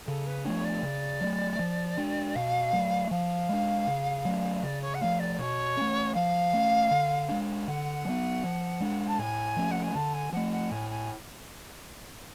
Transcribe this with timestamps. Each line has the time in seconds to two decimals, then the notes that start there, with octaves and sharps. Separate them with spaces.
0.07 C#3 A4
0.26 B4
0.45 F3 A3 D4 C#5
0.64 D5
0.83 C#3
1.21 F#3 A3
1.59 F3
1.97 G#3 D4
2.35 B2 F5
2.73 F#3 A3
3.11 F3 F5
3.49 G#3 D4
3.87 C#3
4.25 F#3 A3 C#4
4.63 C#3 D5
4.81 C#5
4.94 F#5
5.01 F3 A3 F5
5.19 D5
5.38 B2 C#5
5.77 A3 C#4
6.14 F3 F5
6.53 A3 C#4
6.91 D3
7.29 G#3 D4
7.67 D3 F#5
8.05 F#3 B3
8.44 F3
8.80 G#3 D4
9.08 A5
9.19 A2 G#5
9.56 F3 A3 C#4
9.71 F#5
9.83 G#5
9.95 D3 A5
10.14 G#5
10.33 F3 A3 F#5
10.52 F#5
10.71 A2 G#5
10.90 G#5